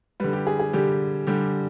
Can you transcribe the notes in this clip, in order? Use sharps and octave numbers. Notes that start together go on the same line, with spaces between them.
D3 G3 B4
G4
G#4
G#4
D3 G3 G4
D3 G3 G4